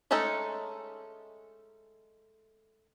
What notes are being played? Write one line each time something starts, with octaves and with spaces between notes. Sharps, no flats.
G#3 A3 C#4 D#4 A4